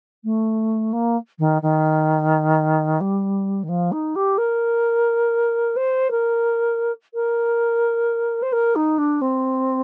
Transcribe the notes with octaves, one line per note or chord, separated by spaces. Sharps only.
A3
A#3
D#3
D#3
G3
D#3
F3
D#4
G4
A#4
C5
A#4
A#4
C5
A#4
D#4
D4
C4